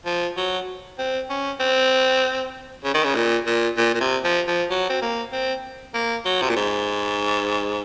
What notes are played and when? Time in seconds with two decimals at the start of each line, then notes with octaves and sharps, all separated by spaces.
0.06 F3
0.37 F#3
0.98 C4
1.30 C#4
1.60 C4
2.84 C#3
2.94 D#3
3.04 C#3
3.15 A#2
3.46 A#2
3.77 A#2
3.94 A#2
4.00 C3
4.24 F3
4.47 F3
4.70 F#3
4.89 C4
5.01 A#3
5.32 C4
5.94 A#3
6.25 F#3
6.42 C3
6.49 A#2
6.56 G#2